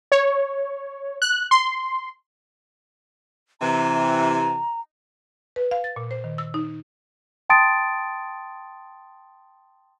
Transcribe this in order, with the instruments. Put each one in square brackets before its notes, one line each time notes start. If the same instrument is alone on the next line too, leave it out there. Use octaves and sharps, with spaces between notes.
[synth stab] C#5
F#6
C6
[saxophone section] C3 E3 [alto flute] A#5
[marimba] B4
F5
A6
A#2
C5
D#3
E6
D#4
[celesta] G5 A5 C6 D#6 A6 D7